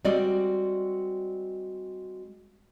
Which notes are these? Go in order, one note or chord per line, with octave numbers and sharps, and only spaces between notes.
G3 G#3 C4 F#4 D5 D#5